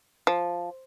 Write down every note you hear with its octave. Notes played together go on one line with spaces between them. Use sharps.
F3